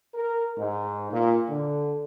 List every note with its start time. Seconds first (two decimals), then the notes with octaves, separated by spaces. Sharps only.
0.14 A#4
0.58 G#2
1.10 A#2
1.49 D3